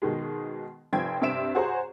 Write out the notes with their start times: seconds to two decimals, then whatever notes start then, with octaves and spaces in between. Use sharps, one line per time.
0.02 B2 D#3 G#3
0.93 F1 F3 C4 G5 G#6
1.21 G2 C3 C4 E5 D7 E7
1.55 F#4 G#4 C5 C#5 F#5 A#5